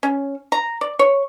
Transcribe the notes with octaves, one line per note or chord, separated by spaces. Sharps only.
C#4
A#5
D5
C#5